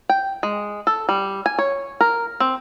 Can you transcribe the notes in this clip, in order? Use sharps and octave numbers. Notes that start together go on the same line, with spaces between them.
G5
G#3
A4
G3
G#5
C#5
A#4
C4